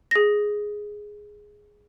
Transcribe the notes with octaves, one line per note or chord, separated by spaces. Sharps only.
G#4 A#6